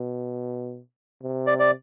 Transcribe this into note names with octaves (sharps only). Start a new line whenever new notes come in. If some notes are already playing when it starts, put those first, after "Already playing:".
Already playing: B2
C3
D5
D5